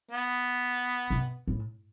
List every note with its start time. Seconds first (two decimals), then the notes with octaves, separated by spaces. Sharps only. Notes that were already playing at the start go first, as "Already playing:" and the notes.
0.11 B3
1.10 C3
1.48 A2